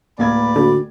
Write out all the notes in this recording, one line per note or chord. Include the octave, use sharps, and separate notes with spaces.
D1 A#3 B4 D5 B5 G#6
D3 F#4